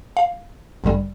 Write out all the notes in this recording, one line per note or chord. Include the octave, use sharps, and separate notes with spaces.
F5
A1 G2 D3 G3